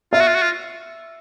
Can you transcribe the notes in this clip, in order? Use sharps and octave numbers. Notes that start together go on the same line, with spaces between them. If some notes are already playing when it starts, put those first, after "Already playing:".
F4 E5
F#4
F4
F#4
F4